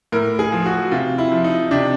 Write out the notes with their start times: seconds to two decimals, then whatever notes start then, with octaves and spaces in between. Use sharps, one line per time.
0.12 A2 A#4
0.39 G#4
0.52 F3
0.66 F#4
0.91 C3 F4
1.18 E4
1.32 F3
1.44 D#4
1.71 C3 D4